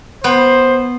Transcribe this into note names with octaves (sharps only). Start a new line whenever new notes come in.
B3 C5 G5